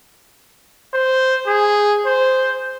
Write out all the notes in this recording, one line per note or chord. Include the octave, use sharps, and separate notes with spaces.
C5
G#4
C5